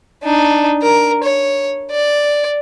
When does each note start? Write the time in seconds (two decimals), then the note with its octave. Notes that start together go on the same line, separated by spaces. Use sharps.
0.23 D4 D#4
0.82 A#4
1.23 C#5
1.91 D5